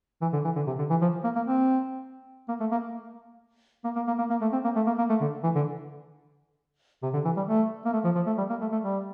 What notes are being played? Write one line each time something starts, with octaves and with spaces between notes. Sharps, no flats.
E3
D3
E3
D3
C3
D3
E3
F3
A#3
A#3
C4
A#3
A3
A#3
A#3
A#3
A#3
A#3
A#3
A3
C4
A#3
A3
A#3
A#3
A3
D3
E3
D3
C3
D3
E3
G3
A3
A#3
A3
F3
F3
A3
G3
A#3
A3
A3
G3